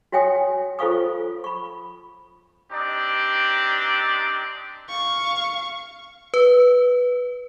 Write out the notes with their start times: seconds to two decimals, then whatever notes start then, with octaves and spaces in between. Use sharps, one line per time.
0.12 F#4 C#5 E5 G5 G#5 D#6
0.79 F4 A4 C5 F5 C#6 D#6
1.44 B5 C#6
2.71 C4 D4 D#4 G4 D5
4.89 F5 C#6
6.34 B4